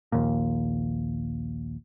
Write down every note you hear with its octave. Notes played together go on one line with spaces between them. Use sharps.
A#1 D#2 A#2